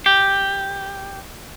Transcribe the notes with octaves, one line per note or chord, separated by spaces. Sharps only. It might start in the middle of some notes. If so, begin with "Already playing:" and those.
G4